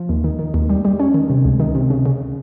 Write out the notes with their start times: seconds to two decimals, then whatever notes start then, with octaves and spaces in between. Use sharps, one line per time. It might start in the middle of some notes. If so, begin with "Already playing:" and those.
Already playing: F3
0.09 D#2
0.24 D#3
0.39 D#3
0.54 D#2
0.69 G3
0.85 G3
0.99 C#4
1.14 D#3
1.30 C3
1.45 C#2
1.60 D#3
1.75 C3
1.90 C#3
2.06 C#3